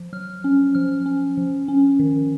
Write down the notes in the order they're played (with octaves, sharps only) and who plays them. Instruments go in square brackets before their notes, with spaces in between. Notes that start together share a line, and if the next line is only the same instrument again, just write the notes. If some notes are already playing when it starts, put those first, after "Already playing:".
Already playing: [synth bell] F3
F#3 F6
C#4
F3 F6
C#4
F3
C#4
D#3